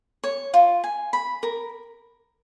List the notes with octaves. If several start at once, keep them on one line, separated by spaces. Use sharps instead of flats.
C#5
F4
G#5
B5
A#4